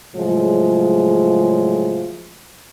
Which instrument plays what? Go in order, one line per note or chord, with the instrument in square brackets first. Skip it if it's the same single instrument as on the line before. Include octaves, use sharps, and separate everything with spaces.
[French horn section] A2 C#3 F3 F#3 G#3